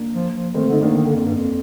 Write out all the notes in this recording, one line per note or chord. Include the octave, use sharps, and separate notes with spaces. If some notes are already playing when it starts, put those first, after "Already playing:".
Already playing: A#3 D4
F3
F3
D#3 A3 C4
D3 D#4
D#3 A#3 D4
D#3
D3
F2
G2
F2